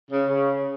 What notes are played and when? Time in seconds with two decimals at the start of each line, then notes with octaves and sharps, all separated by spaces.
0.11 C#3
0.30 C#3